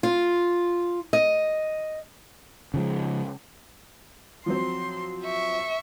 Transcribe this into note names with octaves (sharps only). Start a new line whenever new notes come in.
F4
D#5
C#3 F3 G#3
F3 F#3 C4 C6
E5 C#6